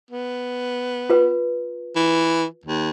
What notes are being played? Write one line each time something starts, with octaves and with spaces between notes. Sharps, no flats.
B3
F4 B4
E3
D#2